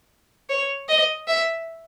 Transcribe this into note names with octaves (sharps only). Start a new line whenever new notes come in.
C#5
D#5
E5